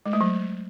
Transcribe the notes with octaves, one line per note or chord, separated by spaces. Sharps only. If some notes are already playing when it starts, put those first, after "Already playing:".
G#3
A3
F#3